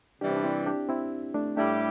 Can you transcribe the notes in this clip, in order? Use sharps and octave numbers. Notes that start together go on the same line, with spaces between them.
C3 E3 G3 D4 G4
C4
D4
C4 E4
D4 G4
C4 E4
A3 D4
A2 G3 A3 D4 E4 G4